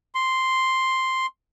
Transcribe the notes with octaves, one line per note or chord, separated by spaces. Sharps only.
C6